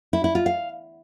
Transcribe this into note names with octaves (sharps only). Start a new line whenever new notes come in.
E4
E4
F4
F5